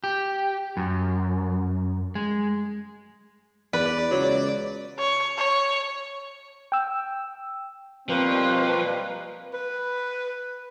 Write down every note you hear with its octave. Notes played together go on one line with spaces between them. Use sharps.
G4
F#2
G#3
E2 B4 D5
C#2 F#3
C#5
C#5
G5 E6
B2 F3 G3 A#3 C4 B4
B4